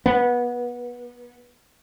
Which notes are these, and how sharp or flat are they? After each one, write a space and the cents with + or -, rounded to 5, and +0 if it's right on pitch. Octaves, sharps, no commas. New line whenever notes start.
B3 -25